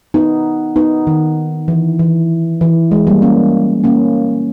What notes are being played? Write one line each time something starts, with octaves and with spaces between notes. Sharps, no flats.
B3 D#4
B3 D#4
D#3
E3
E3
E3
G#3
G3 A#3
A#3 C#4
A#3 C#4